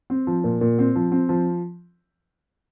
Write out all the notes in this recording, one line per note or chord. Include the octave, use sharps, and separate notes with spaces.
C4
F3
A#2
A#2
C4
F3
C4
F3